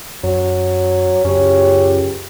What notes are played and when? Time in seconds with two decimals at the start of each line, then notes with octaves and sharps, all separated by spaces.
0.23 F#2 F#3
1.25 C#2 F#2 C#4 G4